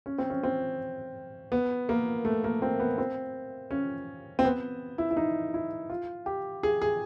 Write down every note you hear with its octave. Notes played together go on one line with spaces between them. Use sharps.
C#4
C4
C#4
C4
B3
A#3
A3
A#3
C4
B3
C4
C#4
C4
B3
E4
E4
D#4
E4
F4
G4
G#4
G#4